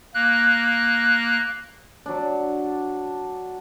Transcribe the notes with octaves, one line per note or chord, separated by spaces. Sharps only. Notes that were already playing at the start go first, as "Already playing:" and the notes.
A#3 F#6
F#3 D4